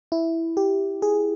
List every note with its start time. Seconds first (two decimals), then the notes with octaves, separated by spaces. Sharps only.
0.12 E4
0.57 G4
1.02 G#4